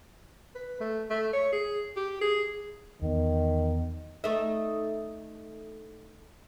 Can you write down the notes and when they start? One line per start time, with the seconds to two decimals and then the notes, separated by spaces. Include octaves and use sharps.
0.55 B4
0.80 A3
1.10 A3
1.33 C#5
1.52 G#4
1.96 G4
2.21 G#4
3.02 E2 D#3 B3
4.24 A3 D#4 E5